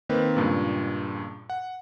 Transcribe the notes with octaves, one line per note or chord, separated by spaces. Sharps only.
D#3 A#3 C4 B4
C#2 G2 A#2
F#5